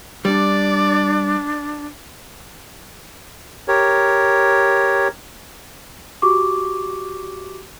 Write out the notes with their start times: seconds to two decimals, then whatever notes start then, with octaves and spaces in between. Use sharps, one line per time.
0.25 G3 D4 D5
3.68 G4 A#4 C#5
6.22 F#4 G4 C#6 D6